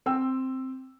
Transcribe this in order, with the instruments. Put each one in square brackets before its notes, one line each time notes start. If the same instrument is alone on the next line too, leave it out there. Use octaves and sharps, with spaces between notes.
[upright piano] C4 G5 E6